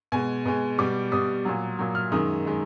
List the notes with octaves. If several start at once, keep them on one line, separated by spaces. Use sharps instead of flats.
B2 G#3 G#5
B2 G#3
B2 G3 D6
B2 G3 D#6
A#2 F#3
A#2 F#3
F6
F#2 D#3 G#3 D#6
D#3 G#3